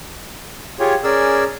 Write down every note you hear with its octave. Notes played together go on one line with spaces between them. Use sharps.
F4 G4 G#4 C#5
C#4 G#4 A#4 D5 E6